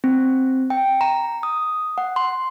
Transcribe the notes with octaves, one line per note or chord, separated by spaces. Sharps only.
C4
G5
A#5
D#6
F#5
C6